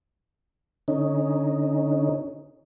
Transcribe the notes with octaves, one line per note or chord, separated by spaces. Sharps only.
D3 C#4 D#4